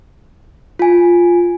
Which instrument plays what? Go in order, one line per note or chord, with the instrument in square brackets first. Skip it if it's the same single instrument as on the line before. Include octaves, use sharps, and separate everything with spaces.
[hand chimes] F4 G#5